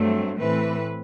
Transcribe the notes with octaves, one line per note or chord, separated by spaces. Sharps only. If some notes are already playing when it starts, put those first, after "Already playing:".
Already playing: G2 F#3 A3 C4
A2 E3 A3 C4 B4